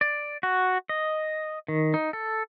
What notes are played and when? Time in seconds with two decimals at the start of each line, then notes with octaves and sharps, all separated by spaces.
0.01 D5
0.43 F#4
0.89 D#5
1.68 D#3
1.94 D#4
2.13 A4